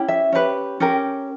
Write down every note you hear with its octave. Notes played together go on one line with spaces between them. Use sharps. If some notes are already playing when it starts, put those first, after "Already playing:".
Already playing: C#4 E4 G4
E5
C#4 G4 B4
C#4 G4 A#4